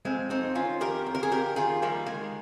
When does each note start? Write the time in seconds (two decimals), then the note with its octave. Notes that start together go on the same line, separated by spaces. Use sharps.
0.05 F2 G#3 C4
0.30 F2 C4 D#4
0.55 D#3 C#4 F4
0.80 D#3 G4 A#4
1.06 F2
1.15 A#4
1.23 G#4
1.32 F2 G4 A#4
1.56 D#3 F4 G#4
1.82 D#3 G3 A#3
2.06 D#3 G#3